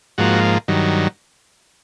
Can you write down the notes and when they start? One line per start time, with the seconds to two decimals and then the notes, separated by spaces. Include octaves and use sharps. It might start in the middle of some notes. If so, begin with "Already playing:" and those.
0.18 G#2 F3 A#3 F#4
0.68 G2 D#3 F#3